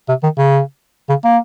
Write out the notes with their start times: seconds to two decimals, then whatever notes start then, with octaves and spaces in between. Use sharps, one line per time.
0.08 C3
0.23 D#3
0.38 C#3
1.09 C#3
1.24 A#3